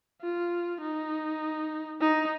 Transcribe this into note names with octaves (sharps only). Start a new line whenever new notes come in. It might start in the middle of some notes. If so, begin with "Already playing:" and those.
F4
D#4
D#4